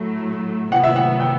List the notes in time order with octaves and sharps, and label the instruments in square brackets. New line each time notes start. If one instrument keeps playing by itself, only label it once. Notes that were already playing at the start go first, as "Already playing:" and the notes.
Already playing: [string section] A2 F#3 A3
[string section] C3 F#3 B3 [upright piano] F#5
[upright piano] E5
F#5
G5